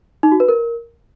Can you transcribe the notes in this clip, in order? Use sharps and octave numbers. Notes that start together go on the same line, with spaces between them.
D#4
F#4
B4
A#4